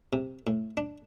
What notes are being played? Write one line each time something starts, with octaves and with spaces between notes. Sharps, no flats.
C3
A2
D4